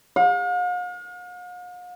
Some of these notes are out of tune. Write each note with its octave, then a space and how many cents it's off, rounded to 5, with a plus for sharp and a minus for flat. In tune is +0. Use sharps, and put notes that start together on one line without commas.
F5 +45